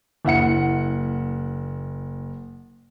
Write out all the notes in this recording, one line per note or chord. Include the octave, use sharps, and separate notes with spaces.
F#1 E4 F#5 C#7